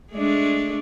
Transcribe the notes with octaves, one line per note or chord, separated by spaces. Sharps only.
G#3 A3 D4